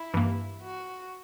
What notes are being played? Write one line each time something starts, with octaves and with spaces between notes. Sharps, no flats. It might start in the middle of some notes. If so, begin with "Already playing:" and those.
Already playing: E4
G2 E3 A#3
F#4